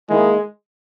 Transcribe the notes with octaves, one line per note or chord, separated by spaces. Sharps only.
D#3 G#3 A#3 E4 G#4